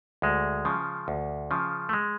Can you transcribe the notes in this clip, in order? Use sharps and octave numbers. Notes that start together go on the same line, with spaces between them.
D2 G#3
C#3 F3
D2
C#3 F3
A3
G#3